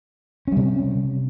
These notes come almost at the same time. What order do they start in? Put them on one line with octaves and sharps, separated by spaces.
C#4 G3 C3